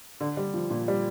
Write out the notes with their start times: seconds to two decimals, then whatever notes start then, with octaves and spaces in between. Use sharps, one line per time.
0.21 D3
0.37 G3
0.54 F3
0.70 A#2
0.88 G3